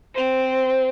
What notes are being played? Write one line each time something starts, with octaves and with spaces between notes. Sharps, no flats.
C4 C5